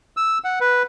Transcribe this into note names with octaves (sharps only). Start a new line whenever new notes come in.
E6
F#5
B4